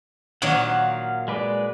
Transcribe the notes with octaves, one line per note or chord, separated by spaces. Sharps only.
A#2 D#3 F#3 F5 F#5
G#3 B4 D5